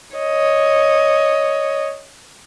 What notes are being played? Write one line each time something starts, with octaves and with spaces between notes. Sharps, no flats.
C#5 D#5